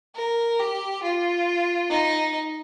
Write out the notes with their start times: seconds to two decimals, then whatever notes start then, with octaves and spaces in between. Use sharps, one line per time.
0.15 A#4
0.60 G4
1.03 F4
1.90 D#4